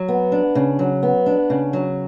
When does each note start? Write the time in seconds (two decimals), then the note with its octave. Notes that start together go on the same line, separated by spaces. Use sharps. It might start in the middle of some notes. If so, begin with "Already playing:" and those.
Already playing: F#3
0.08 B3
0.32 D4
0.55 C#3
0.79 F#3
1.03 B3
1.26 D4
1.50 C#3
1.73 F#3